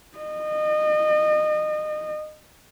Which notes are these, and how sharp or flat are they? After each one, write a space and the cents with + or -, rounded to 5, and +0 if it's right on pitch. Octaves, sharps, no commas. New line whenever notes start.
D#5 -30